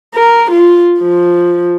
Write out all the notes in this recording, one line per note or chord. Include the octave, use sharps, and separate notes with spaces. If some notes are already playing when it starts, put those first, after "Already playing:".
A#4
F4
F3